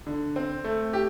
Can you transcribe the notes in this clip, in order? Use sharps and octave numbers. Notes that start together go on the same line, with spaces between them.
D3
C4
A3
G4